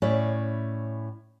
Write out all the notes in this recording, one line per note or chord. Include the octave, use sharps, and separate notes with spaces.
A2 C#4 E4 C#5 D5